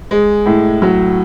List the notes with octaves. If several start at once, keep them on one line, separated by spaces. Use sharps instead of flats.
G#3
A2
F#3